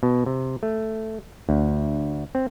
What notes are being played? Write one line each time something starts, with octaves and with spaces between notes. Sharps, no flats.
B2
C3
A3
D2
C4